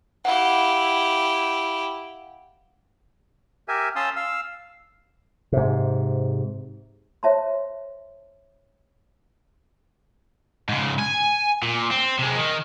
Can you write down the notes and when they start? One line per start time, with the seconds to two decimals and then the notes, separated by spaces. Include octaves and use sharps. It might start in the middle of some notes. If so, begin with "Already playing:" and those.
0.25 E4 G4 F5 F#5
3.68 G4 A#4 E5 G#5
3.96 C#4 F5 A5 C6 D#6 E6
4.16 F5 E6
5.52 G#2 C3
7.23 C5 C#5 E5 A5 C6
10.69 G#2 C#3
10.99 G#5
11.62 A#2
11.91 C4
12.19 C3 G#3
12.37 D#3